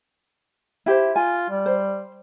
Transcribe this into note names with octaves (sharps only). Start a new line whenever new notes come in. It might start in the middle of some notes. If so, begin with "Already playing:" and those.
E4 G4 C5
F4 G#5
G3
C5